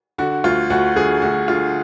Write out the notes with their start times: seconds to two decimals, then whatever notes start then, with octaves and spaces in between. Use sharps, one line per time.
0.18 D3 F#4
0.44 D2 F4
0.70 D2 F#4
0.96 D3 G#4
1.22 D2 F#4
1.48 D3 F4